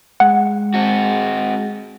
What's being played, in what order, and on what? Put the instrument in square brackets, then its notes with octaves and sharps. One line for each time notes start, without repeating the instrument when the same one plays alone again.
[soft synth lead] G#3 [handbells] F#5
[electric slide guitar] C4 F#4